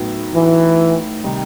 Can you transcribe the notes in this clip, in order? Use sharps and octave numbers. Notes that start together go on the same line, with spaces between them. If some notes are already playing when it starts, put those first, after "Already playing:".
Already playing: A2 F#3 B3 D#4
E3
C3 D#3 G3 D#4